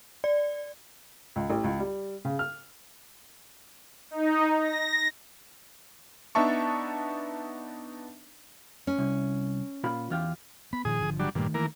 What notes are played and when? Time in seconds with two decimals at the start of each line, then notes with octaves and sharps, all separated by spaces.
0.24 D5
1.36 C#2
1.50 A1
1.64 C#2
1.79 G3
2.25 C#3
2.39 F6
4.11 D#4
4.61 A#6
6.35 B3 D4 D#4 E5 A5 C#6
8.87 C#4
8.99 C2
9.84 A#2 F4 B5
10.10 E2 F4 G4
10.73 B3 B5
10.85 A#2 D#3 F3 G#4 D#6
11.00 G#1 D3 F3
11.19 F#3 G3 D4
11.35 G2 A#2 D#3 A3
11.54 E3 A#3 A#4